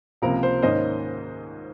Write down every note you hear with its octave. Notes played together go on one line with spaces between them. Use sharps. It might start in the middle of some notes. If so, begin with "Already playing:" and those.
C#2 C3 F3 A#3 A#4
C5
G#2 D#3 A#3 C#4 C5 D#5